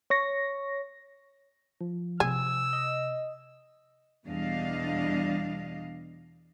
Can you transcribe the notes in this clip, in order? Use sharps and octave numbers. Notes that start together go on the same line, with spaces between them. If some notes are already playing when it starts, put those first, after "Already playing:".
C#5 C#6 A#6
F3
C3 G#4 E6
D#5
E2 B2 G3 D4 D#5 F5